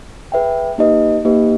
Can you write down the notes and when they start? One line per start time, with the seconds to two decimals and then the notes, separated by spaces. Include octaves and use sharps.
0.32 G#4 B4 E5 G5
0.78 A#3 D#4 G4 B4 D#5
1.25 A#3 D#4 G4 B4 D#5